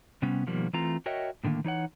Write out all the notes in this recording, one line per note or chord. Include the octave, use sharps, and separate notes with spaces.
C3 G3 B3 C#4
B2 D#3 F3 G3 A#3
E3 A3 C4 F4 A#5
F#4 A#4 C#5 D#5 E5 G5
A2 D3 D#3 G3 A#3
E3 D#4 C#5 F#5